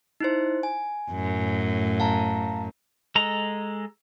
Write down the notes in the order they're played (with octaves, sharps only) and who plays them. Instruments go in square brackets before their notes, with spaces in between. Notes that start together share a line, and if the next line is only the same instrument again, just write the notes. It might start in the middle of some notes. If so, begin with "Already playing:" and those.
[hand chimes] D#4 E4 C5
G#5
[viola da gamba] F#2 A2
[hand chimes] F5 A5 A#5
[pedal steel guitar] G#3 A4 A#5